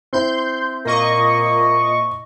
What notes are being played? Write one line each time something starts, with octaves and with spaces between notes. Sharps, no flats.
C4 E4 C6 G6
A#2 A#3 D#5 C#6